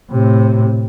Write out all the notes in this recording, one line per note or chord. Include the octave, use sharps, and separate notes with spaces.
A2 C3